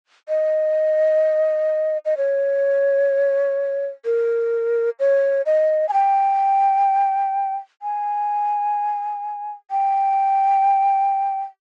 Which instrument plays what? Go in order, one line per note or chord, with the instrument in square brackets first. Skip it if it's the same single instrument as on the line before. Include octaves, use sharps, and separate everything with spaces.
[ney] D#5
D#5
C#5
A#4
C#5
D#5
G#5
G5
G#5
G5